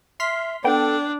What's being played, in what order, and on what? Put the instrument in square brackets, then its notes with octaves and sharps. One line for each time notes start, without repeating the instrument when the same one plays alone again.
[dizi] E5 [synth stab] C6 F6 B6
[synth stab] B3 G5 [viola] D4 [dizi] A4